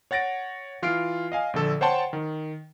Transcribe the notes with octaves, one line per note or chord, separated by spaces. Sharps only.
C#5 F#5 A6 A#6 D7
E3 F4 F6 C7 D7
D#5 F5 G#5
A#1 D3 A4 E6
C5 C#5 F#5 G5 A5 C6
D#3